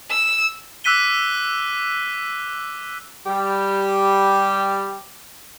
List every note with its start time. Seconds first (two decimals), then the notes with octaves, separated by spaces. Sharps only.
0.11 E6
0.84 D6 E6 F#6 B6 D#7 G7
3.27 G3 G4